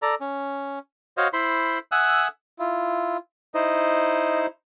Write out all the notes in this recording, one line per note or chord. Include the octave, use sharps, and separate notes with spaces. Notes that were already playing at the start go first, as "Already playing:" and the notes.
A4 D5 A#5
C#4
F#4 C5 C#5 D#5 F5
E4 C5 B5 C6
E5 F#5 G#5 D#6 E6 F#6
E4 F4
D#4 E4 C5 D#5